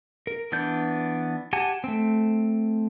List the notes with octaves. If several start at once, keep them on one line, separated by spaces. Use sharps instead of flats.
A#4
E3 B3 D4 G6
G4 F#5 G#5 A5
A3 C4